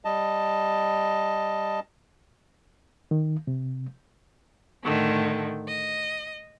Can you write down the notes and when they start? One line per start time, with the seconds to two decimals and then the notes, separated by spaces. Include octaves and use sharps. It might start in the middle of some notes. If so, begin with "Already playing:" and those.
0.05 G3 D#5 A5
3.11 D#3
3.47 C3
4.85 A2 D3 D#3 A3
5.68 D#5